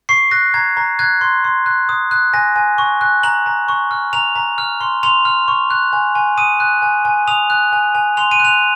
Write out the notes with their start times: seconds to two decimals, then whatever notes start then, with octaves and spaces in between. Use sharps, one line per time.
0.09 C#6 C7
0.31 F#6 A#6
0.54 A#5 G#6
0.77 A#5
0.99 F#6 G#6
1.21 C6
1.44 C6
1.66 F#6
1.89 D#6
2.11 F#6
2.34 G#5 A#6
2.56 G#5
2.78 C#6
3.01 F#6
3.23 A#5 F#7
3.46 A#5
3.68 C#6
3.91 F6
4.13 A#5 F7
4.36 A#5
4.58 F6
4.81 C6
5.03 C6 F7
5.25 F6
5.48 C#6
5.70 F#6
5.93 G#5
6.15 G#5
6.38 D#6 D#7
6.60 F#6
6.82 G#5
7.05 G#5
7.28 D#6 F7
7.50 F#6
7.72 G#5
7.95 G#5
8.17 C6 F7
8.31 D#7
8.40 F#6
8.45 F7